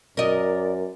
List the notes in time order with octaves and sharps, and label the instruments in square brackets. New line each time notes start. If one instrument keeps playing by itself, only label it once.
[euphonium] F#2 [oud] A#4 D#5 [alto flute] D5